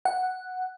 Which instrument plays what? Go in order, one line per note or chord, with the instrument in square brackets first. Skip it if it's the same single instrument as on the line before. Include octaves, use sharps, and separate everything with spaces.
[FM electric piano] F#5